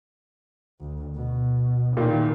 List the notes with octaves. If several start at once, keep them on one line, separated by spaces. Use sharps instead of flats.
D2
B2
A#2 D#3 E3